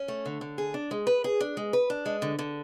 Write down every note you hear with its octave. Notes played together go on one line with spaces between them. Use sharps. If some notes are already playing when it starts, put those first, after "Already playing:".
Already playing: C#4
A3
D3
D3
G#4
D4
G#3
B4
G#4
D4
G#3
B4
D4
G#3
D3
D3